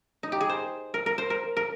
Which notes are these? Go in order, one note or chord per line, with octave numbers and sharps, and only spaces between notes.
D#4
G4
G#4
C5
A#4
A#4
C5
A#4
A#4